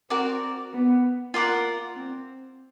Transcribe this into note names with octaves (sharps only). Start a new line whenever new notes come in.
C4 F#4 A#4 D5
B3
A#3 F4 A#4 D5 F#5
C4